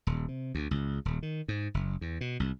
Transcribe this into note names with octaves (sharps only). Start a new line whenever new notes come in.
D#1
C3
D2
C#2
D#1
D#3
G#2
F#1
E2
B2
C2